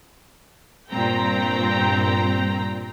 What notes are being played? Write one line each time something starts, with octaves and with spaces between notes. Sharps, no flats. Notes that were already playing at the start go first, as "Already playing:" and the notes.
G2 A#2 C4 G5 A#5